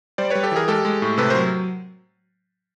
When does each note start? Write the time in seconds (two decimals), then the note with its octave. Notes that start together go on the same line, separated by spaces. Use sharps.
0.18 G3 C5 D5
0.30 G3 B4 C#5
0.43 G4 A4
0.52 E3 G#4 A#4
0.68 G#3 G4 A4
0.85 G#3
1.02 A2
1.18 C3 A4 B4
1.30 F#3 A#4 C5